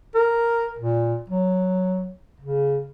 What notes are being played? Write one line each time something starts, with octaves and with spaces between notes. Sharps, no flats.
A#4
A#2
F#3
C#3